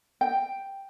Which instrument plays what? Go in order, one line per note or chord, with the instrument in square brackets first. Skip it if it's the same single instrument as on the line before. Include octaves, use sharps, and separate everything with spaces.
[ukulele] G5